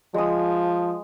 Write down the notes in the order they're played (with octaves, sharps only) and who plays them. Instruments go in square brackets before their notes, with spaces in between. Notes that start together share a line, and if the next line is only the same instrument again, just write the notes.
[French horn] F3 [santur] G#3 D#6